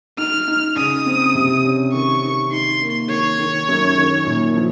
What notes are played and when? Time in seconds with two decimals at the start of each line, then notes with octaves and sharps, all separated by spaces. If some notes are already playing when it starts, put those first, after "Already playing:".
0.18 D#4 F6
0.48 D#4
0.76 C#3 D#6
1.06 C4
1.35 C3
1.65 C#4
1.92 D#3 C#6
2.23 D#3
2.52 D#4 C6
2.81 A#3
3.09 D#3 C#5
3.39 D#3
3.69 F#2
3.98 D#3
4.26 A#2
4.56 F3